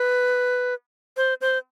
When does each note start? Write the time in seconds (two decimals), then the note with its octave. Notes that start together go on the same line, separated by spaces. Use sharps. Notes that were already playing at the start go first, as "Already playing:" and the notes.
Already playing: B4
1.17 C5
1.41 C5